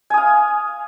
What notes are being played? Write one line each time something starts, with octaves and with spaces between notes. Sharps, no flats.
F5 G#5 D#6